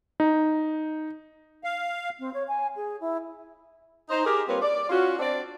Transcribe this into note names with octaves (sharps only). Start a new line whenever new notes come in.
D#4
F5
C4
C#5
G#5
G#4
E4
D#4 C5
G4 G#4 A#4
G3 A#3 C4 F4 B4 C#5
D5
C#4 F4 F#4
C4 D4 D5